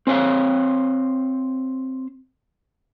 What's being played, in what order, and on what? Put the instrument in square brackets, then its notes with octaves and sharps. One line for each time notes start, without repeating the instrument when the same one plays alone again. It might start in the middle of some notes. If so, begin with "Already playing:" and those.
[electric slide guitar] C4 C5 C#5 F5